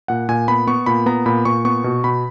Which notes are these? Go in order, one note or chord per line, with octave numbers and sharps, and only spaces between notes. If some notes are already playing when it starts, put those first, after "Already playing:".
A#2 F#5
A#2 G#5
B3 B5
B3 C#6
A#2 B5
B3 A#5
A#2 B5
A#2 C#6
B3 C#6
B2
B2 B5